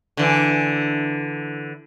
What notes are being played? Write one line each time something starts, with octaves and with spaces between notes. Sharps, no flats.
D3 E3